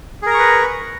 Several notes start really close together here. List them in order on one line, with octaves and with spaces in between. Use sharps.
G#4 A#4 A#5 C#6 B4